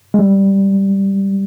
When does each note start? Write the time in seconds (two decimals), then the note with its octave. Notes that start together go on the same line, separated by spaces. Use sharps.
0.14 G#3
0.19 G3